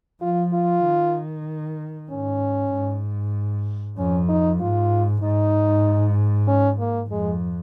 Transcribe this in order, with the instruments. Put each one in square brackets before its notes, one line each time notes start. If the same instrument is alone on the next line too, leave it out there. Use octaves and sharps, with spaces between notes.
[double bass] F3 [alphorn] F4
[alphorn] F4
[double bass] D#3
[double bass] G#2 [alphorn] C#4
[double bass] G#2
[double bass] F2 [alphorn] C#4
[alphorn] D#4
[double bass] G#2 [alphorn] F4
[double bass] G#2 [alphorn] D#4
[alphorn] C#4
A#3
[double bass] F2 [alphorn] G#3